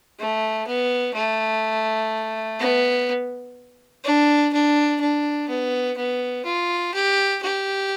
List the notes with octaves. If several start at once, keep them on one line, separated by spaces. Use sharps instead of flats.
A3
B3
A3
B3
D4
D4
D4
B3
B3
F4
G4
G4